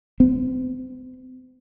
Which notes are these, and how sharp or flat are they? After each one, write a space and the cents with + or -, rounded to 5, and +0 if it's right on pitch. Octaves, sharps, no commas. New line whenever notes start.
C4 -40